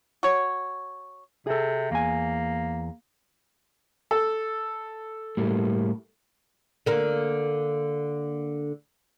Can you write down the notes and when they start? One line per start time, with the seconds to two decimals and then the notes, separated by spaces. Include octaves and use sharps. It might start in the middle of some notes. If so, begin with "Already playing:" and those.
0.23 F#4 C#5
1.47 C3 G#4 A4
1.91 E2 A#3 G#5
4.11 A4
5.37 A2 G3 A#3
6.86 D3 A#3